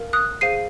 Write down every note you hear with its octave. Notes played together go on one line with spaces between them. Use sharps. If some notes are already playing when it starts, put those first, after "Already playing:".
Already playing: A#4 F5
D#6 F#6
G#4 C5 F5 C7 D#7